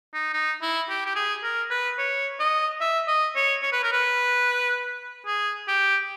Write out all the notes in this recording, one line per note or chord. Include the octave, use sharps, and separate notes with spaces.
D#4
D#4
E4
G4
G4
G#4
A#4
B4
C#5
D#5
E5
D#5
C#5
C#5
B4
A#4
B4
G#4
G4